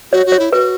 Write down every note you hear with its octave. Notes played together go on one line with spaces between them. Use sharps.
F#4 C#5
F#4
C#5
E4
F#4 B4